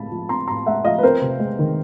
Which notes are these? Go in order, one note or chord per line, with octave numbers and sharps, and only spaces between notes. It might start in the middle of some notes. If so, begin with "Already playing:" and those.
Already playing: A2 G#3 C4 A5 B5
F3
C4 A#5 C6
A2 A#5 C6
G#3 E5 F#5
F3 D#5 F5
B4
C4 A#4 C5
C3
G#3
D#3